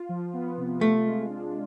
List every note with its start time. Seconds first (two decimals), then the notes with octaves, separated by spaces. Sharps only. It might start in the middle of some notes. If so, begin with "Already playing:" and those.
Already playing: F4
0.09 F3
0.33 B3
0.58 C3
0.81 A3 F4
1.05 G#3
1.29 D4